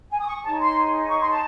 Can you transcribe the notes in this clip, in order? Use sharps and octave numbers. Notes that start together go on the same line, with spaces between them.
G#5
D#6
C#6
D#4 G#4 C#5 A5
C6
C#6
C6
A5